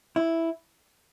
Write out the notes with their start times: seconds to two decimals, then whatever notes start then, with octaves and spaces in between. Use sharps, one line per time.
0.16 E4